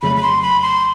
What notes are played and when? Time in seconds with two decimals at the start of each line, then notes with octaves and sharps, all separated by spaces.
0.02 F2 C#3 F#3 A3 B5
0.16 B5
0.23 C6
0.42 B5
0.62 C6